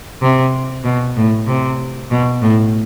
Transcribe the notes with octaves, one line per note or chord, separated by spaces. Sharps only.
C3
B2
A2
C3
B2
A2